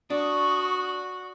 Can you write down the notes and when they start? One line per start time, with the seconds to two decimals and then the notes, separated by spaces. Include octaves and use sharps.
0.10 D4 F#4 C#6 D#6